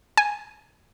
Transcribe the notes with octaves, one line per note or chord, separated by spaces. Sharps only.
G#5